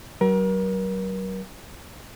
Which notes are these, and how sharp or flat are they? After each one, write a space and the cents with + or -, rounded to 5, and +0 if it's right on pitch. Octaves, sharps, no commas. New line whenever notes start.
F#3 +35 A#4 +35